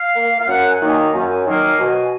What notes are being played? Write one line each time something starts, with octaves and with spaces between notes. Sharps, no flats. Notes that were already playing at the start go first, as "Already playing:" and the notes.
Already playing: F5
A#3
F5
F#2 F#5
G#5
D#3 F#3 A#3
A#5
F#2 G#5
D#3 F#3 A#3
B2